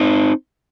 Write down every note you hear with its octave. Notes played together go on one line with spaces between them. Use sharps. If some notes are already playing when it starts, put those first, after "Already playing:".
Already playing: C4 D#4